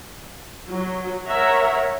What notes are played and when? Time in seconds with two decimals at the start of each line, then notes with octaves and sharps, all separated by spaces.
0.70 F#3
1.28 A#4 C#5 E5 F#5 A#5